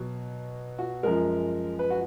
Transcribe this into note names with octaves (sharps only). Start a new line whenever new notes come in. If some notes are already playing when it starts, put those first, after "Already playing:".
Already playing: B2 F#3
F#4
F#2 F3 G#3 A#4
B4
F#4